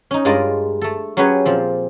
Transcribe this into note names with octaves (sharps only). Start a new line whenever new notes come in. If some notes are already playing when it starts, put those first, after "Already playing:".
C#4 D#4
G2 G#3 F4 A#4 D5 D#5
A3 A4
F#3 C#4 G4 G#4 B4 C#5
A#2 F3 C4